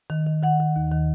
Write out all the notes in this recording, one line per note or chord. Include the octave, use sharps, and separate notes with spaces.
D#3
D#3
D#3 F#5
D#3
D#2
D#3